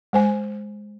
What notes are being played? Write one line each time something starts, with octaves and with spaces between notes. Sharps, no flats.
G#3 C5 G#5